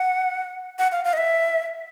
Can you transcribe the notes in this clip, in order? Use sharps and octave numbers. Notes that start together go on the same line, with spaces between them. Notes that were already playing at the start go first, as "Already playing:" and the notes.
Already playing: F#5
F#5
F5
F5
D#5
E5